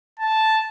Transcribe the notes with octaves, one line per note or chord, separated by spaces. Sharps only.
A5